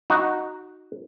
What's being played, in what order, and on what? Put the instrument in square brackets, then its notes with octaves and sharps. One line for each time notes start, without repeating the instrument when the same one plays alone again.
[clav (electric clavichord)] D#4 F#4